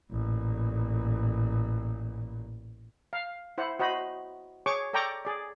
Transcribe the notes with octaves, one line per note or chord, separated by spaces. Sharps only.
A1 A#2
F5
E4 C5 F#5
F#4 C5 D#5 B5
G#4 C#5 C#6 D6
A4 D5 G5 A#5 C#6 D6
G#4 D5